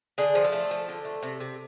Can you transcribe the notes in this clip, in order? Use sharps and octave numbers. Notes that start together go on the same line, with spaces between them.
D3 G#4
F3
A4
A3
F3
D3
A3
C3
C3